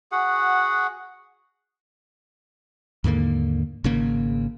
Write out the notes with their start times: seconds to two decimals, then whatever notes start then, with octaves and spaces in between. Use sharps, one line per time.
0.12 F#4 G#4 F#5
3.04 D#2 G#2 D3 A#3
3.84 G#1 C#3 A#3